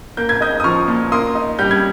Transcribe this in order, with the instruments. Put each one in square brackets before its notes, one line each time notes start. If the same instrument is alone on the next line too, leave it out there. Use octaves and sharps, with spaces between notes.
[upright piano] A#3 G6
G#6
D#4 D#6 G6
D#6
F3 C#6 F6
A#2
A#3 C6 D#6
D#4
G3 G6
G#6